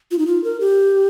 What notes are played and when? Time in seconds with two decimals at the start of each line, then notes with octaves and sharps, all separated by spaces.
0.11 F4
0.19 D#4
0.27 F4
0.44 A#4
0.60 G4